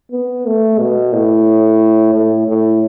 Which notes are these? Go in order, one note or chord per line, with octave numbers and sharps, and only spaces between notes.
B3
A3
B2
A2
A2
A2